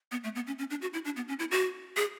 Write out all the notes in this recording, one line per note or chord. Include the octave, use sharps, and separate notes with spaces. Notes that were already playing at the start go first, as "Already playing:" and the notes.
B3
A3
B3
C#4
C#4
D4
F#4
E4
D4
B3
C#4
E4
F#4
G#4